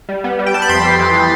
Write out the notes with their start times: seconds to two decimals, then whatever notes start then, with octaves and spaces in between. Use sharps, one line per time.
0.09 G3
0.24 B3
0.39 G3
0.46 G5
0.54 G3 A5
0.62 B5
0.69 F2 C6
0.84 G3
0.99 E3
1.14 E3